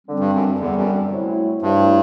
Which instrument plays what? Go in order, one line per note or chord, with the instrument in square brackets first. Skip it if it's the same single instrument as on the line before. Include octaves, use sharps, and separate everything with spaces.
[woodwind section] D3 G3 C4
[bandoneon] G2
F#2
[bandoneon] E2 [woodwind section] D3 G3 C4
[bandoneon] F#2
[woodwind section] C3 F#3 A3 E4
[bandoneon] G2 [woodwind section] C3 F#3 A3 E4